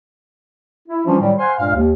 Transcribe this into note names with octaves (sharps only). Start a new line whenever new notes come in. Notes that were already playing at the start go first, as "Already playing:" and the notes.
E4
E3 F3 G3 C#4 D4 F4
A2 D#3 F#3 G3
C5 F5 F#5 G#5 C6
G2 A#2 G#3 F5
D#2